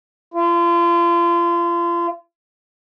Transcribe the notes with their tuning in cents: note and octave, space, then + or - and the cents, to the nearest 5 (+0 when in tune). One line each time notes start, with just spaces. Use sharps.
F4 -35